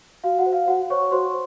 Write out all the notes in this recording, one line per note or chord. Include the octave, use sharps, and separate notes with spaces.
F#4 F5
F#4 F#5
C5
F5
F#4 F#5
C5 C#5 C#6
F#4 C5 C6